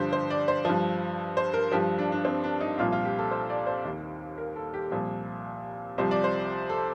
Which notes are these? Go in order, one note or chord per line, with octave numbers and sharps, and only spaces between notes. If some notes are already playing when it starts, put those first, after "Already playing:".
Already playing: G2 D3 F3 G4 C5
C5
D5
C5
G2 F3
C5
A#4
G2 F3 G4
D4
D4
C4
D4
D#4
C2 A#2 F3 F4
F4
G4
A4
C5
D5
C5
D#2 D#3
A#4
A4
G4
C2 A#2 F3
C2 C3 F3 C5
D5
C5
A4